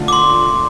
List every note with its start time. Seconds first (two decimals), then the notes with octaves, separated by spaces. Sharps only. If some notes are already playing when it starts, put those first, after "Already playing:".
Already playing: D3 A3 D4 F4
0.08 D6
0.13 C6